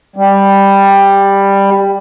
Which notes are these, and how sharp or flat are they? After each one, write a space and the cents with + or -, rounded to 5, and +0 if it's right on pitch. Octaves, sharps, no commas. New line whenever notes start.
G3 +10